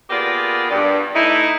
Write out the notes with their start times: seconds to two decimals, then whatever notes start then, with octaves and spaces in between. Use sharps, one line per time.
0.10 A#3 B3 F4 G4 G#4 D5
0.70 G2
1.15 A3 D#4 E4